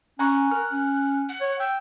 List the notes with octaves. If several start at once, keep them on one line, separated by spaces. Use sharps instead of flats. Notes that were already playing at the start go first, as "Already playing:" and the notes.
C#4 G#5 A#5 C#6 F#6
A#4 F6
C#4
F#5
C#5
G5 E6